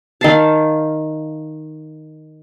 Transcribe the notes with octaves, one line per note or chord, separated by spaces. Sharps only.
D#3 F5 A5